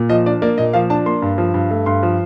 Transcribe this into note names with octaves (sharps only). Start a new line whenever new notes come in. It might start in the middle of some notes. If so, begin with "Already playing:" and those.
Already playing: A#2
F3 D#5
D4 D5
A#3 D5
A#2 D#5
F3 F5
D4 A5
A#3 C6
G2
F3
G2
A3
G2 C6
F3